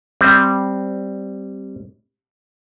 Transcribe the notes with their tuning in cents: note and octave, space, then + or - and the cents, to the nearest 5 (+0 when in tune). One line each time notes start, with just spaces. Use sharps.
G3 +0 C4 +0